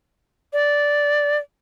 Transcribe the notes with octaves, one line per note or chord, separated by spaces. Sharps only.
D5